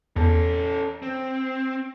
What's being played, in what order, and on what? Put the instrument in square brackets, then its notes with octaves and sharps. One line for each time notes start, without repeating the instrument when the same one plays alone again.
[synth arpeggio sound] E2 [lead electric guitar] C#4 A4
[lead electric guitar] C4